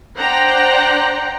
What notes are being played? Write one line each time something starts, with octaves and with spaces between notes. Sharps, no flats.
D4 C5 D5 F#5 G5 A#5